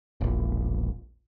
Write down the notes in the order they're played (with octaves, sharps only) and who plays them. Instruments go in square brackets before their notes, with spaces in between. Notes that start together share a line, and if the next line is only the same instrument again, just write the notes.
[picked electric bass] E1 A#1